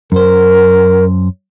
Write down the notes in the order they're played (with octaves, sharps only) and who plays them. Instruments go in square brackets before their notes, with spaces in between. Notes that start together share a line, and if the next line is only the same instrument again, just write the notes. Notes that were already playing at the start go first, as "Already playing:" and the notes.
[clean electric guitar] F#2 C5 [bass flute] A#4